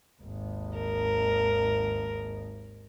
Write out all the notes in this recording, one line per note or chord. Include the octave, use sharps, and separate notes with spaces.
G#1 D#2
A#4